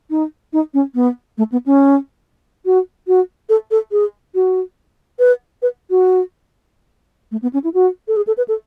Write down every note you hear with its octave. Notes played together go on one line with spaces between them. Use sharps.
D#4
D#4
C#4
B3
A3
B3
C#4
F#4
F#4
A4
A4
G#4
F#4
B4
B4
F#4
A3
B3
C#4
E4
F#4
A4
G#4
A4
B4
A4